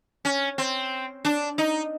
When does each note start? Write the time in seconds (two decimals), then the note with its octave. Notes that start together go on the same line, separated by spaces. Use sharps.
0.25 C#4
0.58 C4
1.25 D4
1.58 D#4